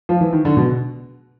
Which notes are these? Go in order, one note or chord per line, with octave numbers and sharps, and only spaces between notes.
F3
E3
D#3
D3
B2